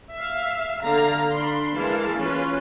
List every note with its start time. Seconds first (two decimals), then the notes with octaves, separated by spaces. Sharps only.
0.15 E5 F5
0.84 D3 F5 A#5
1.33 D4 B5 C6
1.76 E3 G#3 A#4 F5 A5
2.18 C#4 F4 B4